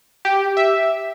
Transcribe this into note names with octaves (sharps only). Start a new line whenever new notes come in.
G4
E5